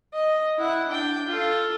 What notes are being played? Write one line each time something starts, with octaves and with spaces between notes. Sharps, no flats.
D#5
E4 F#5
D4 G5
F4 A4